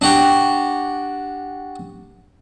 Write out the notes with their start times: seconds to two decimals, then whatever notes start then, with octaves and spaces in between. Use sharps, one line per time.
0.01 D4 F#4 G4